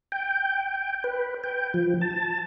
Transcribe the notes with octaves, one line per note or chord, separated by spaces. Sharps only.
G5
B4
G5
F3
A5